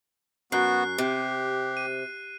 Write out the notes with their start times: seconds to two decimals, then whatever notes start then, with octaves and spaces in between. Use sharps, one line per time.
0.52 F#2 B3 F#4 F#6 C7
0.98 C3 G4
1.77 D#7